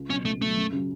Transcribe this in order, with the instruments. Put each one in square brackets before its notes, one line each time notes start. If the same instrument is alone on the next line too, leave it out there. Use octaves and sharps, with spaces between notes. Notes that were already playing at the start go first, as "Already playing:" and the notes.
Already playing: [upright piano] C#2
[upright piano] B2 F#3 [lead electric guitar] C#4
[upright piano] C#2 [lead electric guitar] A3
[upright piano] B2 F#3 [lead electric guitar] A3
[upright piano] F#2
C#3 F#3